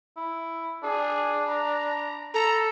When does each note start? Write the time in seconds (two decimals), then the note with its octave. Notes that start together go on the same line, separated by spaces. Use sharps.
0.17 E4
0.83 D4 G#4
1.48 A#5
2.34 A4 A#5